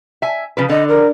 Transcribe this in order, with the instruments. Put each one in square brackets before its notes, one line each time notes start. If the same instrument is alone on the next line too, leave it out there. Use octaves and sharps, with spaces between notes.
[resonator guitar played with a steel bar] E5 G#5
C#3 F3 B4
[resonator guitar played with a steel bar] D3 [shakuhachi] D#5
[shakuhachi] A#4